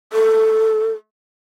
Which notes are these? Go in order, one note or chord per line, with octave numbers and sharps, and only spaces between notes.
A4